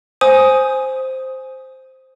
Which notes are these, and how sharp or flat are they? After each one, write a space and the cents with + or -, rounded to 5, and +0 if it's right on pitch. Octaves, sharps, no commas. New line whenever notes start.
C5 +0 G#5 +0 D#6 +5